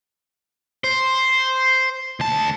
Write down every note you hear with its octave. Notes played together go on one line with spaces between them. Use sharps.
C5
D2 A5